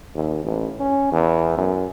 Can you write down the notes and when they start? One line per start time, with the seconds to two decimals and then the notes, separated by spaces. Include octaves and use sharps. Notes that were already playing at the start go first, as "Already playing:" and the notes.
0.15 D#2
0.45 A1
0.80 C#4
1.12 E2
1.57 F#2